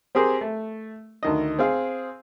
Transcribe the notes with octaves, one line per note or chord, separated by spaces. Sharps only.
C4 G4 G#4 A#4 C5
A3
D2 D#3 D#5
C4 G#4 F5